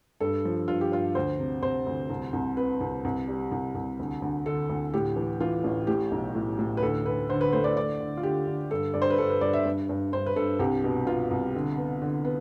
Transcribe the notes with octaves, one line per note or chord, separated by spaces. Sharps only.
G2 A4
F3
G2 F4
G4
G2 F4
D2 C5
C3
C3 C5
D2
C2
C2
C3 B4
C2
C2
G3
C2
C2
D2
D2
D3 A4
D2
A2 G4
E3
E3 F4
A1
A2 G4
B1
A2
A2
B4
D2 A4
D2 B4
D3 C5
B4
A3 C5
D5
D3 D5
D3
F4
D3 G4
D3
G2 A4
G2 D5
C5
B4
G2 A4
B4
G2 D5
E5
G2
G2
G2 C5
B4
G2 A4
C2 G4
B2
B2 F4
C2
D3
B3
D3
B3